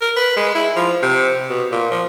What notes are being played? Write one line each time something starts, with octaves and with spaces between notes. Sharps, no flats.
A#4
B4
G#3
E4
F3
C3
B2
A#2
F3